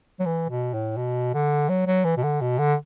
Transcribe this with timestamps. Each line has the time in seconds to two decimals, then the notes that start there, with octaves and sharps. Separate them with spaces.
0.20 F#3
0.26 E3
0.49 B2
0.74 A2
0.97 B2
1.34 D3
1.69 F#3
1.87 F#3
2.05 E3
2.17 B2
2.23 D3
2.41 B2
2.59 D3